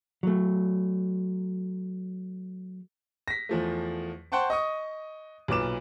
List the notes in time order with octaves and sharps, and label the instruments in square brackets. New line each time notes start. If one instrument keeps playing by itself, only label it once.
[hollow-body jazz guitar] F#3 A3
[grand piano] A#6 B6
E2 F3 A3
C5 F#5 G5 A5 C#6
D#5 C#6 D#6
B1 A#2 B4 D6 E7